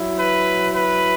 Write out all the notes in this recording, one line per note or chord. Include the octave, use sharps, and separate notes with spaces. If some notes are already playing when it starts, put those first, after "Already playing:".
Already playing: F#3 E4
B4
B4